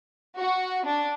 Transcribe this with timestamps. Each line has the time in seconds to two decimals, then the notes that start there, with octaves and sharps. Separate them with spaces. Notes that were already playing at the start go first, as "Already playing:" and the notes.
0.38 F#4
0.85 D4